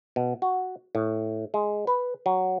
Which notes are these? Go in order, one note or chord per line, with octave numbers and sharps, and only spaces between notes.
B2
F#4
A2
G#3
B4
F#3